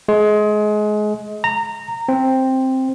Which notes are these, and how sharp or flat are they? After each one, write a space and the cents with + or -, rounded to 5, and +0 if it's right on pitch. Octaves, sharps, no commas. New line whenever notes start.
G#3 +25
A#5 -20
C4 +5